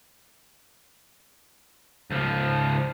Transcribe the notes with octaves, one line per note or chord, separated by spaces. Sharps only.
C#2 F3